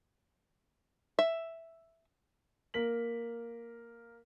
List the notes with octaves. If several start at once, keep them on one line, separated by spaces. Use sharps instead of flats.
E5
A#3 A#4 B6 F#7